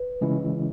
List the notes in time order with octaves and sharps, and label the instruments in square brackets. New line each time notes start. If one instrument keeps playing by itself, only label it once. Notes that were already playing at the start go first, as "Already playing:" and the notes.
Already playing: [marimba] B4
[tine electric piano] C#3 E3 G#3 C#4 E4